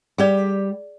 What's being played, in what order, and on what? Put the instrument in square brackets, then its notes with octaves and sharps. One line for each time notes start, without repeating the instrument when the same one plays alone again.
[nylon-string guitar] G3 G4 [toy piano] G#4 D5